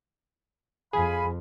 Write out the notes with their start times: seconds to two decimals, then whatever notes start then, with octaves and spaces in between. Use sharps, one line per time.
0.93 F2 G#4 F5 G#5 B5